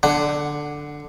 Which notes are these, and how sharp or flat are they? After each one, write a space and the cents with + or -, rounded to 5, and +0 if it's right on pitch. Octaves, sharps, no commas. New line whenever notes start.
D3 +5 F#5 +0